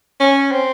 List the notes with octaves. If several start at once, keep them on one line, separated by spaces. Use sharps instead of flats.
C#4
C4